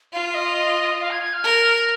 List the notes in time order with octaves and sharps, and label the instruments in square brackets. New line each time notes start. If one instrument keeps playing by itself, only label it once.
[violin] F4 [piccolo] F5
[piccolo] F5
D#5
F5
G#6
G#6
F6
[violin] A#4